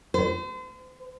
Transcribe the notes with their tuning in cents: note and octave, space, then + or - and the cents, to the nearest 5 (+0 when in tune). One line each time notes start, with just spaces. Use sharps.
C5 -40